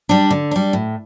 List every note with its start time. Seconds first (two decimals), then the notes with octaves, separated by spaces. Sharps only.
0.09 G3 D4
0.31 D3
0.51 G3 D4
0.73 A2